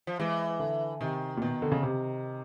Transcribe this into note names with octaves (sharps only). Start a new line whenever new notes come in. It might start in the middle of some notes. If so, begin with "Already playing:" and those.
F3
E3 G#3
D3
C3 D#3
A#2
B2 D#3
D3
C#3
C3